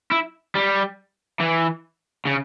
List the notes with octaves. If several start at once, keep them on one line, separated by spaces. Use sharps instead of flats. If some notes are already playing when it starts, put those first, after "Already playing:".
E4
G3
E3
C#3